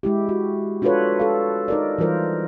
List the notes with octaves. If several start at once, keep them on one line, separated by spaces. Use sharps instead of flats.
G#3 E4 G4
F#4
D4 F4 F#4 A4 B4 C#5
A4 F5
D#4 A#4 D5
E3 G3 F4 A#4 C5